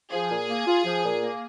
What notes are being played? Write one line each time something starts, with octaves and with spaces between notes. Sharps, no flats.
F3 G#4
A#2
A#3
F4
F3
A#2
A#3